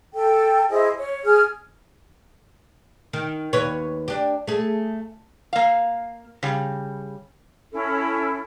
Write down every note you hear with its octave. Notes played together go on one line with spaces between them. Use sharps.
A4 G5
E4 G#4 C5 D#5
C#5
G#4 F6
D#3
D#2 B4 C#5
D4 G4
A3 G#4
A#3 F5
C#3 G3
C#4 E4 A4